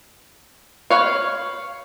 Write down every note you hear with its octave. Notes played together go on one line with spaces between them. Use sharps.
B4 C#5 F5